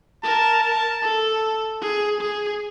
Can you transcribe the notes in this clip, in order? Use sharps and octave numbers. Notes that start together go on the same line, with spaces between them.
A#4 A5
A5
A4
G#4
G#4